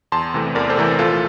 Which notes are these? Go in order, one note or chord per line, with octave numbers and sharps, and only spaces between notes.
E2 A5 C6
C3 E3 A3
E2 A#4 D5
A4 C5
C3 E3 A3
A#1 F4 A4